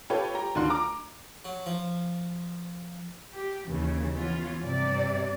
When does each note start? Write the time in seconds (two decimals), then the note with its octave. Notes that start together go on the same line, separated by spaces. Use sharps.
0.10 F4 G4 A4 B4 C#5
0.34 G4 A#5
0.55 D2 D#3 D4 F4 F#4 C6
0.70 A#5 D6
1.45 F#3
1.66 F3
3.35 G4
3.67 D#2 C#3 E3
4.14 E3 F3 B3 C#4 F4
4.62 G2 C3 D5